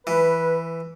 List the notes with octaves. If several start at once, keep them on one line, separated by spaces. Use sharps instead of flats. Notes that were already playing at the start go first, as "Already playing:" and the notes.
E3 B4